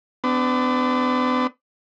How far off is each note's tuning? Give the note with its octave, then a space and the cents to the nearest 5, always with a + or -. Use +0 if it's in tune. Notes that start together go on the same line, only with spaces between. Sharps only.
B3 +40 D4 +0